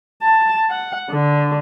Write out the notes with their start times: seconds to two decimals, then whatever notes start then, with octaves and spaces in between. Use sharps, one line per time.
0.22 A5
0.70 F#5
1.10 D3